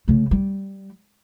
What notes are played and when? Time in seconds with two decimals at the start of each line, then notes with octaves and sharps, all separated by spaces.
0.08 C#3 A3
0.31 G3